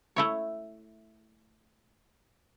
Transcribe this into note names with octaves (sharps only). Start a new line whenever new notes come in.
A3 E4 C#5